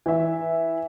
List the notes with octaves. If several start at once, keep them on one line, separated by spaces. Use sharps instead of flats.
E3 E5